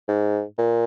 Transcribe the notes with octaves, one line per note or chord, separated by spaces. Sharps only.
G#2
A#2